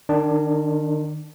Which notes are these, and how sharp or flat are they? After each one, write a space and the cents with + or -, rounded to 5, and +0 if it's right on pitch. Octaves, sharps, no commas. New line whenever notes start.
D#3 -30 D4 +0